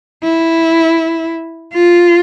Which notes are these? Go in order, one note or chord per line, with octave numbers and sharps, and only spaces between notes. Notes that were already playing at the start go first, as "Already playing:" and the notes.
E4
F4